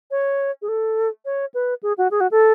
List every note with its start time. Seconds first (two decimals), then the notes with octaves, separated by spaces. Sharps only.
0.11 C#5
0.62 G#4
0.68 A4
1.25 C#5
1.54 B4
1.83 G#4
1.98 F#4
2.11 G#4
2.20 F#4
2.31 A4